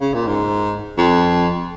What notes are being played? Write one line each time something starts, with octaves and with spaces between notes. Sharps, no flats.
C#3
A#2
G#2
F2